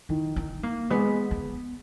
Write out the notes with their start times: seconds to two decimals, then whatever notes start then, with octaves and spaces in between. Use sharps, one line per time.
0.09 D#3 E4
0.36 D#4
0.63 A#3
0.90 G#3 B3
1.31 B3